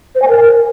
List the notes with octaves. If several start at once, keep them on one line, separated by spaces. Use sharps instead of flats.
C5
G#5
A#4